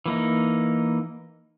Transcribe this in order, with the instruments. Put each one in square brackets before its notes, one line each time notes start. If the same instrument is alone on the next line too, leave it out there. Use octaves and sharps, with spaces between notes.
[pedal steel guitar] E3 A#3 D#4